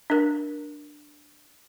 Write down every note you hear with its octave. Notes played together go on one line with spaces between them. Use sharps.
D4 A#4